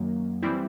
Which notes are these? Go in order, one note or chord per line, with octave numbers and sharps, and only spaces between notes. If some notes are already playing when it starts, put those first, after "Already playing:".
Already playing: F#2 D#3 F#3 A#3
E3 G3 C4 E4